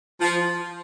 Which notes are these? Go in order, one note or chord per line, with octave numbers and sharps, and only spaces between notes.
F3